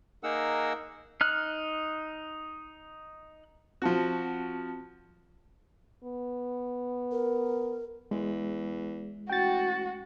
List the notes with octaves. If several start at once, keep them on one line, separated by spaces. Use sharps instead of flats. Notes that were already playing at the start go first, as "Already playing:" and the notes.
A#3 D#4 G#4 A#4 F#5 E6
D#4 F6 F#6
F3 C4 F#4 A5
B3
A#4
E2 G#3
A1 F#4 G5 A6